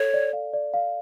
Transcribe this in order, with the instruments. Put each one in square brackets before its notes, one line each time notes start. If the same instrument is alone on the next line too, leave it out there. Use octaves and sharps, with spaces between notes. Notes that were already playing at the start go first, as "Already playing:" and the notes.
Already playing: [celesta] A4 [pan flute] C#5
[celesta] D5
F5
D5
F5